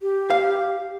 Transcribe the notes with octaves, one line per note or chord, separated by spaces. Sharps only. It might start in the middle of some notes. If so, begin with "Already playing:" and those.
G4
F5